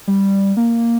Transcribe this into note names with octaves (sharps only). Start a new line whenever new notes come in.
G3
A#3